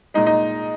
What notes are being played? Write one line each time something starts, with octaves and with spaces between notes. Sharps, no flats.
A#2 G#3 D#4
D#4